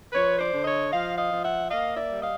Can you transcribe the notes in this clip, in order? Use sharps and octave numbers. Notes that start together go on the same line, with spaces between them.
F3 B4 C#5
C5 D5
D3
C#5 D#5
F3 D#5 F5
D#5 F5
F3
E5 F#5
A#3 D#5 F5
D5 E5
G3
D#5 F5